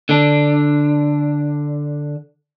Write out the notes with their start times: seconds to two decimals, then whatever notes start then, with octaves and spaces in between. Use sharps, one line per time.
0.09 D3 D4